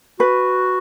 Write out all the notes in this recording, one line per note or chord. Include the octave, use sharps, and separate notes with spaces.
F#4 B4